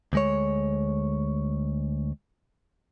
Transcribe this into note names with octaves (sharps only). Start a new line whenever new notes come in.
D2 G#3 C#5